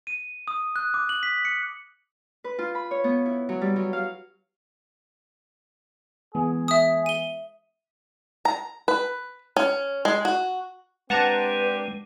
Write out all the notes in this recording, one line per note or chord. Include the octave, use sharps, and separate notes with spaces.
D#7
D#6
F#6
D6
F#7
B6
C#7
B4
F4
B5
C#5
B3
E4
F#3
G3
F#3
F5
E3 G#3 B3 G#4
E5 D#6
D#7 G7
A#5
B4
C#4
G#3
F#4
G#3 C4 D4 G4 B4 F#5 A5 A#5